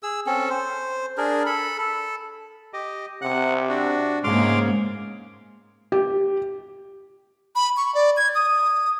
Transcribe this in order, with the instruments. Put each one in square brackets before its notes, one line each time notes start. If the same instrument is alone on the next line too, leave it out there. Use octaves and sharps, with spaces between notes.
[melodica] G#4 E6
C4 C#4 A4
C5
D4 G#4 A#4
A4 B5
A4
[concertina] G4 D#5
[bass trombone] C3 [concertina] F#5 F#6
[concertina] D4 F#4
[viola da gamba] G#2 G#3 A#3 [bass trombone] C#3 [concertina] C6 D6 F6
[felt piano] G4
[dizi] B5
C#6
D5
G#6
D#6